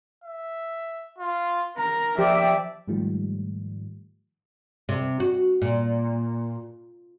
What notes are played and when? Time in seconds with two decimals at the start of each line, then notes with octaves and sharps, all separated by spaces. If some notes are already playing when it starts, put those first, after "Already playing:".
0.24 E5
1.18 F4
1.78 A#4 A#5
2.18 F3 G4 D5 E5
2.88 G#2 D#3 F3 G3 A3
4.89 C3
5.20 F#4
5.62 A#2